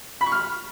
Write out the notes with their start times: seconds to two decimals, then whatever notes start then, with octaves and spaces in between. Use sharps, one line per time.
0.21 B5
0.26 C#6
0.32 F6